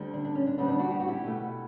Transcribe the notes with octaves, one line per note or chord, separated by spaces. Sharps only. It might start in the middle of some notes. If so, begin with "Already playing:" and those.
Already playing: D2 D3 G3
D4
D4
C#4
D4
D2 D3 G3 B3 C#4
D4
D4 F#4
G4
F#4
E4 G4
B2 A3